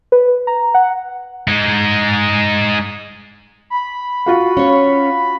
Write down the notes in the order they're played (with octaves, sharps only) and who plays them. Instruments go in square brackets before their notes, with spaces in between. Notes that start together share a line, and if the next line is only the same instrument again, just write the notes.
[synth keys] B4
A#5
F#5
[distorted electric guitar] G#3 D#4
[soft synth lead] B5
[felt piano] F4 F#4 F5
[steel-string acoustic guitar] C#4 C#5